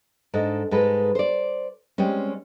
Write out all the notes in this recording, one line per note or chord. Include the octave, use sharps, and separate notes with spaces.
G#2 D4 A4 D#5
G#2 G#3 A4 B4
C5 D5
G3 G#3 C4 C#4